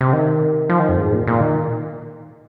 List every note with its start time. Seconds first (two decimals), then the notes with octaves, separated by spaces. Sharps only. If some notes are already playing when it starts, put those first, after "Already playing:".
0.01 C3
0.13 D#3
0.69 F3
0.79 D#3
0.89 F2
0.98 G#2
1.12 A#2
1.27 A#2
1.41 D#3